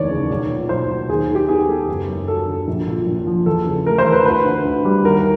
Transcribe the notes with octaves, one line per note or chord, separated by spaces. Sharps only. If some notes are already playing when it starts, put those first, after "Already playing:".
Already playing: F1 D#2 E3 C#5 D5
C#3
B1
A#2
B1 C5
F#3
D#2 G#4
D#3
G4
B3 G#4
G#3 A4
F#1
F#2
F#3 A4
D3
A#1
A#2
A#1
F3
E2 A4
C#3
A3 A#4
C5
E3
B4
D2 B4
D3
D2
G3
D#2 A#4